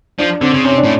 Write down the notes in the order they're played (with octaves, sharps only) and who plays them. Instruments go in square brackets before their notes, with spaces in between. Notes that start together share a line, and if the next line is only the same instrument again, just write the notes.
[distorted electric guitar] F3 [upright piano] D4
[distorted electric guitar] D3 [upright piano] C4
[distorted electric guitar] C#3
[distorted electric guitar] C3 [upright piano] C#4
[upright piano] D4
[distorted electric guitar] A2